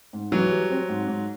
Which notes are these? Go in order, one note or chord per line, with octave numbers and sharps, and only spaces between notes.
G#2
E3 F#3
G3
C4
G#2
G#2